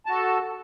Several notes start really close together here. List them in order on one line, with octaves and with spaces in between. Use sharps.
A5 F#4 A4